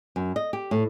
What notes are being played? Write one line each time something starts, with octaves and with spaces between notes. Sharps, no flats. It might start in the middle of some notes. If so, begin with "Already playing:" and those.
F#2
D#5
G4
A2